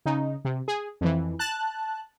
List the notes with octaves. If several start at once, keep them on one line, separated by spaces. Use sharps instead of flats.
C#3 D#4
C3
G#4
F2 E3
A5 F#6